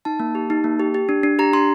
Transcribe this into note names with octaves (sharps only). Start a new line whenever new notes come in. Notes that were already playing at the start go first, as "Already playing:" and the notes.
D#4 A5
A#3
G4
D#4
A#3
G4
G4
D4
D4
G4 A#5
D4 C6